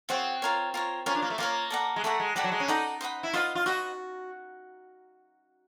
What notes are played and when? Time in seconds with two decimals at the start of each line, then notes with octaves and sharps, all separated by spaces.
0.09 C4 F4 G#4 C#5 F#5
0.42 F4 A#4 C#5
0.74 F4 A#4 C#5
1.06 C#4 F4 A#4 C#5
1.15 D4
1.22 A#3
1.30 A3
1.38 A#3 F4 A#4 C#5
1.70 A4 D5 F#5 A#5
1.96 G#3
2.04 A3 A4 D5 F#5 A#5
2.20 G#3
2.35 G3 A4 D5 F#5 A#5
2.44 F#3
2.52 G#3
2.60 C#4
2.68 D#4 A4 D5 F#5 A#5
3.01 C5 D#5 F#5 B5
3.23 E4
3.33 F4 C5 D#5 F#5 B5
3.55 F4
3.66 F#4 C5 D#5 F#5 B5